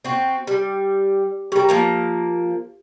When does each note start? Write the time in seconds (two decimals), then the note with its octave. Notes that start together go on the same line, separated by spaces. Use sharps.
0.05 C4 F#4
0.47 G3
1.52 G3 G4 A#4
1.69 F3 A#3 A#5